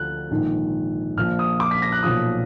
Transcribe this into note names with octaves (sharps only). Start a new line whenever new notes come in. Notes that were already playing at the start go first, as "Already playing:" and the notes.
Already playing: D2 D3 F3 F#6
A#1 G#2 D#3
A#1 A#2 F3 F6
D#6
D6
B6
A#6
F#6
B1 A#2 F3 D#6